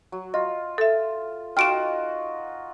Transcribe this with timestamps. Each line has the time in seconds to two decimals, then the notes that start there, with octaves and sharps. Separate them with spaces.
0.12 F#3
0.34 F4 D#5
0.78 A4 E5
1.57 D#4 F4 F#4 G5 F6 D7 E7